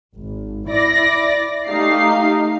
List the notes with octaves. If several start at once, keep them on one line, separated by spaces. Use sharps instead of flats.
G#1
E4 D5 A#6
A3 D#4 G4 F5 C7